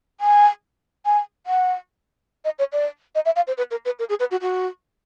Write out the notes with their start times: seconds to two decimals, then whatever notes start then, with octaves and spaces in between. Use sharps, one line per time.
0.21 G#5
1.05 G#5
1.47 F#5
2.45 D#5
2.59 C#5
2.73 D5
3.15 D#5
3.25 E5
3.36 F5
3.47 C5
3.58 B4
3.71 A#4
3.85 B4
3.99 A#4
4.09 G#4
4.20 B4
4.31 F#4
4.42 F#4